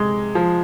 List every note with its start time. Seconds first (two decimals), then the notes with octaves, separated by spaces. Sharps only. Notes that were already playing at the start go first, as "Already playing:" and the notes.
Already playing: C3 G#3
0.35 F3